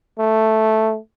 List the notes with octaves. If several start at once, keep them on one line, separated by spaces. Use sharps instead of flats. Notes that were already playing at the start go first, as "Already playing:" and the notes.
A3